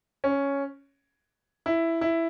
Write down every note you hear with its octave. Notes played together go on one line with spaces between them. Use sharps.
C#4
E4
E4